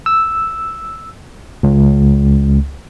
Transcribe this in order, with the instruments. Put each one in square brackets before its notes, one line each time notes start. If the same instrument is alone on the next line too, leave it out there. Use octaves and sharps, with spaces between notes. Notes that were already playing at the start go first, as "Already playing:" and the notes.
[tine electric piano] E6
C#2